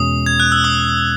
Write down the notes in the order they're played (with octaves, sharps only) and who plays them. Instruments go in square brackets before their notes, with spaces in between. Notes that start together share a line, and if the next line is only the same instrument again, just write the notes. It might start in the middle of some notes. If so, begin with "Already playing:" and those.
Already playing: [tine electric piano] E2 B2 G#3 C#4 [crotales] D#6
[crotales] G#6
F#6
E6
D#6